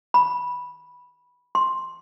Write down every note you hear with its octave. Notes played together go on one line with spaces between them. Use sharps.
B5
C6